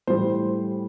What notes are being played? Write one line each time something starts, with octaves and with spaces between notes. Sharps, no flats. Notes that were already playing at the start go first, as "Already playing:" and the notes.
A2 E3 G3 C5